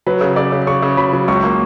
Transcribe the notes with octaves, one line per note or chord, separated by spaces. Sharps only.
F#3 B4
C#3
C#3 D5
C#3
C#3 C#6
C#3
F#3 B5
F#3
C#2 C#6
A#3